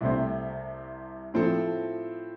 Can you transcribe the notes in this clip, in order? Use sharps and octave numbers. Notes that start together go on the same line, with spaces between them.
C2 C3 A3 C4
A2 F3 C4 A4